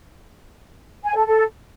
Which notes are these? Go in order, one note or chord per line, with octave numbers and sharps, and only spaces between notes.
G#5
A4
A4